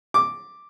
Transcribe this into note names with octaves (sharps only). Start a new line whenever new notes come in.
D6